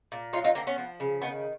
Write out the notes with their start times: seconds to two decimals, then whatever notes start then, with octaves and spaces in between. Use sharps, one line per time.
0.12 A#2
0.33 F#3 D#4 F4
0.44 D#4 F4
0.55 D3 A#3 C4
0.67 B3 C#4
0.78 F3
1.00 C#3
1.22 D#3 B3